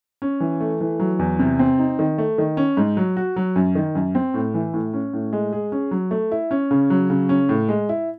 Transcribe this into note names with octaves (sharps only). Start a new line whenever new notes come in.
C#4
E3
A3
E3
F#3
E2
C3
C4
D#4
D#3
A3
D#3
C#4
G#2
F#3
F#4
F#3
F#2
D#3
F#2
C4
A2
E3
A2
C#4
A2
G#3
G#4
C#4
F#3
A3
E4
C#4
C#3
F#3
C#3
C#4
A2
G#3
E4